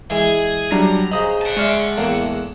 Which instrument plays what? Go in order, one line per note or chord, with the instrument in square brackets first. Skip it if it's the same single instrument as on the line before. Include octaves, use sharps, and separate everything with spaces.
[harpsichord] E3 G#3 E4 [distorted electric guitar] G#4
[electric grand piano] F#3 G3 D4 [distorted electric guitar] A#5
[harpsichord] C#3 C5 B5 [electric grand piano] D#5 D#6
[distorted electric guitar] F#5 A5
[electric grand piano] G#3 F6 [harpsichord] C#5 D5 E5
[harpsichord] E2 A2 A#3